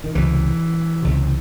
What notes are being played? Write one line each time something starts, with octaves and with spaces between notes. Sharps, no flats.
D#3
C#2 C3 E3
C#2 C3